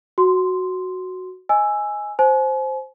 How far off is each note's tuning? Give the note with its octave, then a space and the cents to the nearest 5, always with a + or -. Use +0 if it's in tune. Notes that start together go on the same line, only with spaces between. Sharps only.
F#4 +0 C6 -5
D#5 +0 G#5 +0 E6 +5
C5 +0 G#5 +40